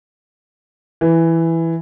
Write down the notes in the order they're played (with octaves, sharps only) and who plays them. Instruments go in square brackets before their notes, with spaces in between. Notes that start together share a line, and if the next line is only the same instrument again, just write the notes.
[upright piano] E3